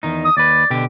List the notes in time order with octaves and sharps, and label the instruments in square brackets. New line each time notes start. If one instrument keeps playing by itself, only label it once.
[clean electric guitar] E2 D#3 D#4
[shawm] D#6
[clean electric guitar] D#2 B4 [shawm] D5
[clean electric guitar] B2 D3 G4